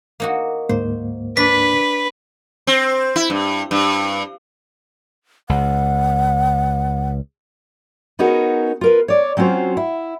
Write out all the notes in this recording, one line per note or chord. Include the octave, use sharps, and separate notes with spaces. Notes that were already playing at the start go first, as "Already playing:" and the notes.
A#3 D#4 F#4
D2 G#2 A#3 C5
D4 B4 B6
C4
E4
G2
G2
C#2 F#5
B3 C#4 D#4 F#4 G#4 A#4
F4 A#4 B4
C#5 D5
F#3 C4 C#4 F4 F#4 C5
E4